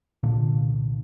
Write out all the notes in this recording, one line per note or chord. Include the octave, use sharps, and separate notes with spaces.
C2 A#2 D3